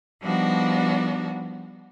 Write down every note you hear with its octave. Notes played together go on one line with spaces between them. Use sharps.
F3 G3 B3 D4 D#4 F#4